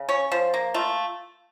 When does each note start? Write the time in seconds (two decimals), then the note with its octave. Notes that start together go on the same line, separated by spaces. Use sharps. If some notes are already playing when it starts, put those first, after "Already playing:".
Already playing: C#3
0.09 C#4 C#5
0.31 F3 C5
0.54 A#3
0.74 A3 F4